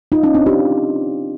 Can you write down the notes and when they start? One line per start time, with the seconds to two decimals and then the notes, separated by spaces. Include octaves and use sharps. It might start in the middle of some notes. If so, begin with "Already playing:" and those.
0.12 D#4 F4
0.23 C#4 D#4
0.34 C4 D4
0.46 F4 G4